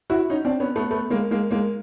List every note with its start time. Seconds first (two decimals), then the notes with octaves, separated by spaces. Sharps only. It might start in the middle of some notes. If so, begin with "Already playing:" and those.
0.10 E4 F#4
0.30 C#4 D#4
0.45 C4 D4
0.60 B3 C#4
0.76 A3 B3
0.91 A3 B3
1.10 G#3 A#3
1.31 G#3 A#3
1.51 G#3 A#3